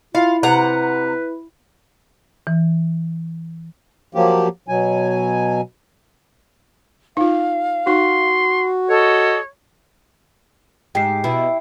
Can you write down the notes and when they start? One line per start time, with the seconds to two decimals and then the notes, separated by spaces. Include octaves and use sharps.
0.15 E4 F4 F5
0.43 C3 B4 F#5 A#5
2.47 E3
4.15 F3 F#3 A#3 G4
4.68 B2 F#3 G#5
7.17 D#4 F4 F5
7.87 D#4 F#4 C6
8.89 A4 C#5 D#5
10.95 G#2 G4 G5 C7
11.24 B2 E4